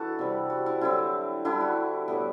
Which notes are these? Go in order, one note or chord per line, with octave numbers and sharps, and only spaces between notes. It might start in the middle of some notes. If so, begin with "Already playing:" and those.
Already playing: E3 D4 E4 F#4 A4
C3 G3 C4
F#4
E4
D3 F#3 C4 E4
D3 G3 D4 E4
F#4
A2 G3 B3 E4